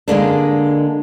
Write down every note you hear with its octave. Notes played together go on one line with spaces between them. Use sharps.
D3 G#3 A#3 D4